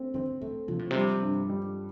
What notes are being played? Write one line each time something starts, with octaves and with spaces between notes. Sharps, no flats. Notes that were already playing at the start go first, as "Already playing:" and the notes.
Already playing: A3 C4
D3 C4
A2 A3
C3 F3
A2
C3 G3
G2
G3